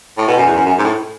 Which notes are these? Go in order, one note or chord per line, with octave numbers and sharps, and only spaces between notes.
A2
B2
F#2
E2
F#2
F#2
G#2
A2